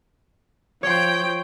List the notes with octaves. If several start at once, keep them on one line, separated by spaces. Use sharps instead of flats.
F3 C#5 G5 C6